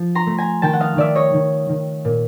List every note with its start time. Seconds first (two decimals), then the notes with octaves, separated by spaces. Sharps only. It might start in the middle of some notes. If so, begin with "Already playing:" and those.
Already playing: F3
0.15 A#5 C6
0.26 A3
0.38 G#5 A#5
0.62 D#3 G5 A5
0.73 F#5
0.80 D#5 F5
0.96 D#3 D5 E5
1.15 C#5 D#5
1.34 D#3
1.69 D#3
2.05 A#2